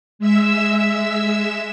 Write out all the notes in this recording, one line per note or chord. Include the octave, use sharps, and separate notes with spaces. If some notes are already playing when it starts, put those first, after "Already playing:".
G#3 E5 E6